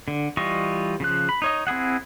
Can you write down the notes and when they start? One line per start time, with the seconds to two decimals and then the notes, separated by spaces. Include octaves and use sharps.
0.08 D3
0.37 E3 G3 F4 D#5 C#6
1.00 C#3 F3 F#6
1.29 B5
1.42 D#4 C#5 D#5
1.67 C4 E4 G#4 F#5